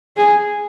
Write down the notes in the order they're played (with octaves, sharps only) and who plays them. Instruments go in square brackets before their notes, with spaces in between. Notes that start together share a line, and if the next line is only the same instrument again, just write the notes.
[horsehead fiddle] G#4